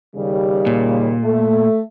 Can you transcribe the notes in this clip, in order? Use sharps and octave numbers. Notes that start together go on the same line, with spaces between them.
D#2 C#3 G3
A#2
A3